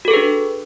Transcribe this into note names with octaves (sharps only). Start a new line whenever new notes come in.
D4 F#4 G#4 A4 B4